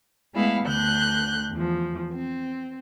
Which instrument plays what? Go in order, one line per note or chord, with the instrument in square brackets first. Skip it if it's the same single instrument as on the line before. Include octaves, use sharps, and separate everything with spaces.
[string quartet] G#3 A3 B3 E4 F5
D2 D3 F#6 G6
E2 F3
C4